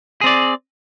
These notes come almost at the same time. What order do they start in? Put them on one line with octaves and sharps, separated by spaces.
G#4 C4 D5